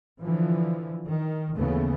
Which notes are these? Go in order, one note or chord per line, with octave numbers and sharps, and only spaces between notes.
D3 E3 F3
D#3
D#2 C#3 E3 A3 B3